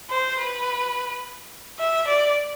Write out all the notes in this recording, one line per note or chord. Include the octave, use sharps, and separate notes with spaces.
C5
B4
E5
D5